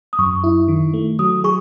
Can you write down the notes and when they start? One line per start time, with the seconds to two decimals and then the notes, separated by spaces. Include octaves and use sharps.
0.13 D#6
0.18 F#2 C#6
0.44 E4
0.68 D#3
0.94 A3
1.19 F#3 D#6
1.44 G#4 C#6